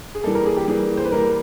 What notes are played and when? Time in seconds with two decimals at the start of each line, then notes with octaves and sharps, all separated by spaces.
0.15 G#4
0.24 E3 G3 A#3 A4
0.35 A#4
0.46 G#4
0.57 G4
0.68 E3 G3 A#3 G#4
0.97 C5
1.05 B4
1.12 E3 G3 A#3 A#4